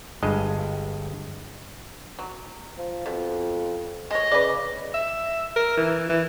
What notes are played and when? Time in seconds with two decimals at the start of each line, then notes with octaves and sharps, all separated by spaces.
0.23 G1 G2 G#3 D#5
2.19 F#3
2.78 F3
3.06 F2 B2
4.11 G#3 C#5 D#5
4.32 C#3 B4 D5
4.94 E5
5.56 A#4
5.77 E3
6.09 E3